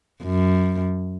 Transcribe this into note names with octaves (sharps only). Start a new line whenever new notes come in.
F#2